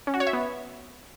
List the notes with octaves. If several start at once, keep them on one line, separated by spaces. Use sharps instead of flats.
C#4
F#4
C#5
E5
B3